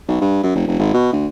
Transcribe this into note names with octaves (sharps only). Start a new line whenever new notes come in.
B1
G2
F#2
F1
F1
G#1
B2
D2